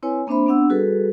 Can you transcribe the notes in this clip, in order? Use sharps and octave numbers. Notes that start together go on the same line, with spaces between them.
C4 E4 B4 C#5 G#5
A#3 C4 D4 C5 E5 B5
B3 C4 D4 F#5 E6
G3 F#4 G#4 A4 B4